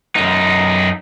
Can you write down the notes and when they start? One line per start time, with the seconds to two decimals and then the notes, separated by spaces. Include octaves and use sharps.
0.16 F#2 D#4